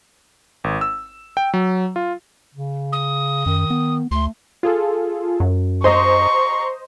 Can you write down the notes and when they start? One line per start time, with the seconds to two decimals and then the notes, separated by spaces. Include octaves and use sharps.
0.64 G#1
0.81 E6
1.37 G5
1.54 F#3
1.96 F4
2.55 C#3
2.92 D#6
3.46 F#2 D#3
3.70 B3
4.11 D2 A3 C6
4.63 F4 G#4 A4
5.40 F#2
5.84 C5 D#5 A#5 C6 C#6